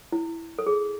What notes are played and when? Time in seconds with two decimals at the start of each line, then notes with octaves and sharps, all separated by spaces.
0.12 E4
0.59 A4
0.67 G#4